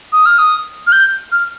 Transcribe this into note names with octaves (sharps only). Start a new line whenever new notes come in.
D#6
F6
D#6
F6
G6
F6